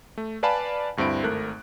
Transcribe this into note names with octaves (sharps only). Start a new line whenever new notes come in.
A3
B4 D5 F5 G#5 A5 B5
D2 G2 C4 E4 D7
G#1 A3 A#4 F#6